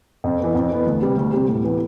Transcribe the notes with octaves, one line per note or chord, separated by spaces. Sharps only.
F2
E3 B3
F2
E3 B3
D2
C3 G3
D2
C3 G3
A2
E3 B3